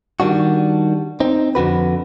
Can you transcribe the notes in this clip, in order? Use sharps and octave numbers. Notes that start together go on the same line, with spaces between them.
D#3 G3 D4 F#4
C4 D#4
F2 D3 F#4 B4